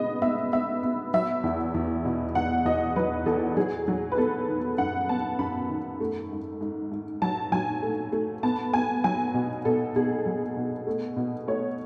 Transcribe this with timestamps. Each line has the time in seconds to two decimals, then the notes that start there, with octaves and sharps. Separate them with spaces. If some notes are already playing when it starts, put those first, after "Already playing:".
Already playing: C#3 G#3 B3 D#5
0.22 B3 E5
0.53 B3 E5
0.83 B3
1.14 F#3 E5
1.43 E2
1.74 E2
2.05 B2
2.35 E2 F#5
2.65 E2 D#5
2.96 F#3 B4
3.26 E2 A4
3.57 F#3 G#4
3.88 F#3
4.12 B4
4.17 B3 A4
4.48 D#3
4.78 F#2 F#5
5.09 B3 A5
5.39 F#2 B5
5.69 D#3
6.00 A3
6.31 G#2
6.61 G#2
6.92 G#2
7.22 F#3 A5
7.52 F#3 G#5
7.82 A3
8.12 A3
8.43 B3 A5
8.73 B3 G#5
9.04 F#3 G#5
9.34 B2
9.65 B2 A4
9.96 B2 G#4
10.26 F#3
10.57 B2
10.87 A3
11.17 B2
11.47 A3 C#5